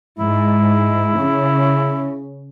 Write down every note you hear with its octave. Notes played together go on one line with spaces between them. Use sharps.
G#2 E4
C#3